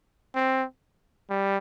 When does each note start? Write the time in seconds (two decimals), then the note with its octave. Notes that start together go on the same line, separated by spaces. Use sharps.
0.36 C4
1.30 G3